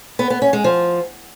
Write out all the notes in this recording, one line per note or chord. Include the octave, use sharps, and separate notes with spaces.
B3
B3
C#4
G#3
F3